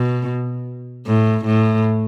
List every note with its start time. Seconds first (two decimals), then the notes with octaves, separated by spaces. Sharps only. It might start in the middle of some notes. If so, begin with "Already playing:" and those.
Already playing: B2
1.07 A2
1.45 A2